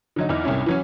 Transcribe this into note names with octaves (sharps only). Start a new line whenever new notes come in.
D3 F#3 D#4
E2 D#4 E4 F6
C2 G#2 C#4 E4
E3 F#3 C#4